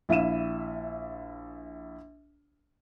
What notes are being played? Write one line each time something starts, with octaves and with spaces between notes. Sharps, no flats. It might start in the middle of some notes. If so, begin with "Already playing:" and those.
A#1 E4 E5 F5 D#7 E7